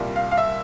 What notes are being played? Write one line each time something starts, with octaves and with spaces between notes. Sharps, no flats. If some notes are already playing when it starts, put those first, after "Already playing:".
Already playing: C2 A#2 G3
F5
F5
E5